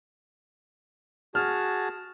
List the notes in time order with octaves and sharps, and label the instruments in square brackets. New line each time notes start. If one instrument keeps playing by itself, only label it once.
[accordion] F#4 G#4 A5 [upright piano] F6